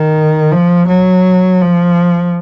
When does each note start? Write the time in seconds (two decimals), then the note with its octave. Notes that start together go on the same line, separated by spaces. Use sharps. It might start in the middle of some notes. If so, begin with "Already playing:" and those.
Already playing: D#3
0.52 F3
0.88 F#3
1.61 F3